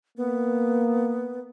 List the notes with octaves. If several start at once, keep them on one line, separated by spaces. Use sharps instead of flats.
A#3 B3